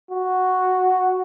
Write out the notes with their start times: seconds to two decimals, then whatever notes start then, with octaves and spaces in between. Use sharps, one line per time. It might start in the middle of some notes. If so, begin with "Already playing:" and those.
0.11 F#4